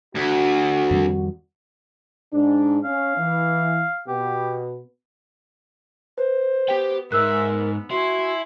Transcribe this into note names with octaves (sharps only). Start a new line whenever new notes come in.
D2 F#4
F2 D#3 G3
G#2 D4
C#4 F5
E3
B2 B3 G4
B4 C5
B3 G4 G5
G#2 A#4 E5 E6 F#6
B3
E4 F#4 G#5 C6